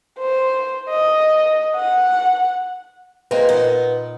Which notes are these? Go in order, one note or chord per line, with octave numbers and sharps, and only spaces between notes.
C5
D#5
F#5
G#3 A#3 C4 A#4 B4 G#5
A#2 B3 D#4 F4